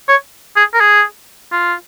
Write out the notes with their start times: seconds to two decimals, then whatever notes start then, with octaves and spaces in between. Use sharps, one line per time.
0.08 C#5
0.56 G#4
0.74 A#4
0.81 G#4
1.52 F4